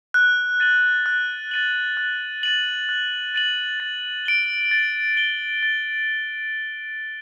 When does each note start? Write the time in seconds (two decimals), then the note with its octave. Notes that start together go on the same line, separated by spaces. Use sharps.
0.14 F#6
0.60 A6 D#7 F#7
1.06 F#6
1.51 A6 D#7 F#7
1.97 F#6
2.43 A6 D#7 F#7
2.89 F#6
3.34 A6 D#7 F#7
3.80 A6
4.26 D7 G7
4.71 A6
5.17 D7 G7
5.63 A6